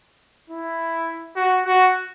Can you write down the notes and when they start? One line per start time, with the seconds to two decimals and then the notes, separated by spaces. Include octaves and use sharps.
0.50 E4
1.36 F#4
1.66 F#4